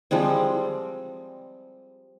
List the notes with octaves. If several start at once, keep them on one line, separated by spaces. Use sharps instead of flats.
F3 G3 G#3 C4